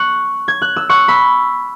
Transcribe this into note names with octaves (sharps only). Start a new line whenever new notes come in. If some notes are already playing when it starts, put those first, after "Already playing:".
Already playing: C#6 F#6
G#6
F#6
E6
C#6 F#6
B5 E6